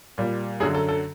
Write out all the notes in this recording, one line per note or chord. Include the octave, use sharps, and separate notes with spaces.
A#2 G3
F#2 D3 F#3 G#4
A4
A4